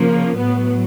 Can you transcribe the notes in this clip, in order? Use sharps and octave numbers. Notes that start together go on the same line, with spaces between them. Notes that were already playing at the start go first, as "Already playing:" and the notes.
Already playing: C#3 F3 A#3
A2 F#3 B3